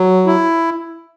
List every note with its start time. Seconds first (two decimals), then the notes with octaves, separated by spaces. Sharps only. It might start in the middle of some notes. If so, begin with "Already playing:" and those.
Already playing: F#3
0.27 E4